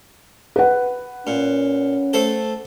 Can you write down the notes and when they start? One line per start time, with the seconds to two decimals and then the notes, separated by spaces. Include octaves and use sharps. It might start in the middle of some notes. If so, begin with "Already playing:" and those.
0.56 B4 F#5
1.27 A#2 C#4
2.13 A3 A4 C5